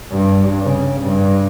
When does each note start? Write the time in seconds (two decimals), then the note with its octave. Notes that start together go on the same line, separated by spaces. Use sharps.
0.12 G2
0.63 C#3
1.01 G2